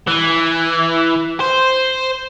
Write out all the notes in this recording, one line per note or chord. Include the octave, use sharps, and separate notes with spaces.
E3
C5